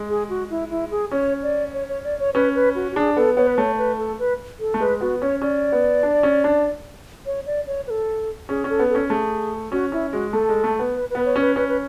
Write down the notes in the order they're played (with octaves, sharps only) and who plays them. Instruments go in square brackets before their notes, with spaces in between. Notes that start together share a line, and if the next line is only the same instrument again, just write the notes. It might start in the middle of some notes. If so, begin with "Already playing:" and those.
Already playing: [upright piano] G#3
[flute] G#4
F#4
E4
E4
G#4
[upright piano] C#4 [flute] C#5
[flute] D5
C#5
C#5
D5
C#5
[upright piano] C#4 [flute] B4
[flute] B4
F#4
F#4
[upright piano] D4 [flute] G#4
[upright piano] B3 [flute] A4
[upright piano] B3 [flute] C#5
[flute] B4
[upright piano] A3 [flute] C#5
[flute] B4
A4
B4
A4
[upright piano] A3
[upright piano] G#3 [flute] B4
[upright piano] B3 [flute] F#4
[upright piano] C#4 [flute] C#5
[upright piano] C#4 [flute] D5
[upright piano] B3
D4
C#4
D4
[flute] C#5
D5
C#5
B4
A4
[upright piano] C#4 [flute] G#4
[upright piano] C#4
[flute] A4
[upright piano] B3
[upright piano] C#4 [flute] A4
[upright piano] A3 [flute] G#4
[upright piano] C#4 [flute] F#4
[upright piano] C#4 [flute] E4
[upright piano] G#3 [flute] F#4
[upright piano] A3 [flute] A4
[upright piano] G#3
A3
B3
[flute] B4
[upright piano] B3 [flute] B4
[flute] C#5
[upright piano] C#4
[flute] B4
[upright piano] C#4 [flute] B4
[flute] B4